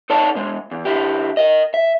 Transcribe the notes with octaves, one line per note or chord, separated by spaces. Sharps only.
D#4 A4 C#5 D5 F#5 A5
B2 G#3
E2
D3 E4 G4
A#4 D#5
E5